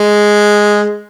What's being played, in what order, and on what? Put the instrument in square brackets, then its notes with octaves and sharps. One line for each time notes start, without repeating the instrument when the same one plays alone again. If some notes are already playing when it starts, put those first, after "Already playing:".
Already playing: [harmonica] G#3